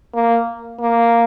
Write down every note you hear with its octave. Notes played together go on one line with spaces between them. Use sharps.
A#3
A#3